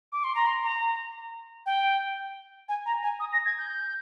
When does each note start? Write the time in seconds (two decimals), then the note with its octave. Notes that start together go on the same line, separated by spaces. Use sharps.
0.12 D6
0.24 C6
0.35 A#5
0.46 C6
0.64 A#5
1.66 G5
2.69 G#5
2.86 A#5
3.03 G#5
3.20 D#6
3.33 A#6
3.46 G#6
3.58 G6